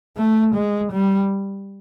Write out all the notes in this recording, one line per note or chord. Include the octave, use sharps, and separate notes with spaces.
A3
G#3
G3